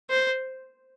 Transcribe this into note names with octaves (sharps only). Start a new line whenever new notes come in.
C5